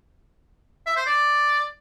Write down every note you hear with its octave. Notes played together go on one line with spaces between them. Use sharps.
E5
C5
D5